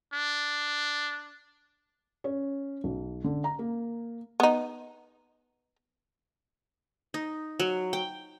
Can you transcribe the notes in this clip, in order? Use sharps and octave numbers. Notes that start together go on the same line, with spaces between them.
D4
C#4
B1
D3
A#5
A#3
B3 D#4
D#4
F#3
G5